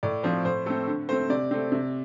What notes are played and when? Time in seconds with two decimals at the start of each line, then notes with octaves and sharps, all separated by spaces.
0.03 A2 D5
0.23 F3 C4 C5
0.45 A2 C5
0.66 A3 C4 A4
0.87 D3
1.09 A3 C4 C5
1.30 C3 D5
1.51 A3 C4
1.72 C3